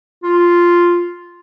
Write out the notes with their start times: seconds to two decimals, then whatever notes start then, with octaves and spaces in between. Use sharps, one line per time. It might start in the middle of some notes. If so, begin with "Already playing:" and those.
0.23 F4